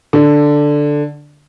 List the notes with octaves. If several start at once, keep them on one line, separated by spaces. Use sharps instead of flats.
D3